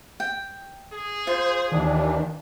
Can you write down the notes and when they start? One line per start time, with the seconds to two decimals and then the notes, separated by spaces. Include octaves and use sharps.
0.20 G5
0.93 G#4
1.27 F4 C5
1.72 D#2 D#3 E3 D4